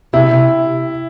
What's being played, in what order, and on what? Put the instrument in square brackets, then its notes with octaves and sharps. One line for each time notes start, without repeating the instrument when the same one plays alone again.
[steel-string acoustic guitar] C3 [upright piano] E4
[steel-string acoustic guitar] C3